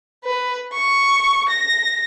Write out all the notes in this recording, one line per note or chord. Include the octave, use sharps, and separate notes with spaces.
B4
C#6
A#6